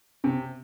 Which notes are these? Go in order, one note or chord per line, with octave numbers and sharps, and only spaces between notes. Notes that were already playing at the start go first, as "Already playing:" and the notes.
C3 C#4